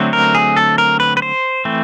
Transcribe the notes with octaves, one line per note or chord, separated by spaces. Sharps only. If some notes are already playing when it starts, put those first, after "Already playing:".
Already playing: D3 F#3 A3 C4
A#4
G#4
A4
A#4
B4
B4
C5
E3 A3 C4